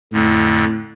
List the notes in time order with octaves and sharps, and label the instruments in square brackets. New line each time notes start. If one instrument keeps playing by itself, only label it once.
[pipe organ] F2 D3 [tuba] A2